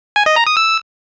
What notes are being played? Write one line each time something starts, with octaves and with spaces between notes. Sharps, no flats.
G#5
D#5
A#5
D#6
E6